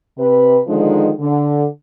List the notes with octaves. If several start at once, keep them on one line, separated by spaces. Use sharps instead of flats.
C3 B4
D3 D#3 F3 G#3 D4 D#4
D3